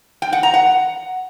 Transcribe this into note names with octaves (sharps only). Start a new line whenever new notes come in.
G5
F#5
A#5
F#5